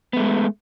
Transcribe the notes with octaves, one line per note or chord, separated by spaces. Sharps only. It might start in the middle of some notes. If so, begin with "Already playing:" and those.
G#3 A3 B3